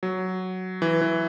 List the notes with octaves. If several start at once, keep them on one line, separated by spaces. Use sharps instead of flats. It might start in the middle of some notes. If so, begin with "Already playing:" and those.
F#3
E3
E3